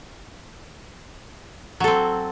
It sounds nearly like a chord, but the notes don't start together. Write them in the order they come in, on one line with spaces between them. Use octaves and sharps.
F#3 A4 C4